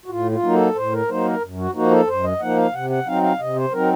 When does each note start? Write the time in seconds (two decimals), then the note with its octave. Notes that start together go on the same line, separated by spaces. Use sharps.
0.06 F#4
0.10 A2 F4
0.31 F4
0.42 F#3 A#3 D#4
0.54 A4
0.75 A2 C5
0.92 A#4
1.08 F#3 A#3 D#4 C5
1.25 A#4
1.41 F#2
1.58 F#4
1.74 F3 A#3 D#4 F#4
1.91 A4
2.07 F#2 C5
2.24 D#5
2.40 F3 A#3 D#4 F#5
2.57 F5
2.73 C3 F#5
2.90 F#5
3.06 F#3 C4 D#4 F5
3.23 F5
3.39 C3 D#5
3.55 C5
3.72 F#3 C4 D#4 A#4